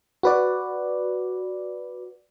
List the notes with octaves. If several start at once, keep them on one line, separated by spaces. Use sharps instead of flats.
F#4 B4 D5